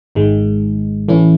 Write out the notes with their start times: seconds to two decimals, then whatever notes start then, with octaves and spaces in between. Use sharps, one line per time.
0.15 G#1 G#2 D#3 G#3
1.08 A2 E3 A3 C#4 E4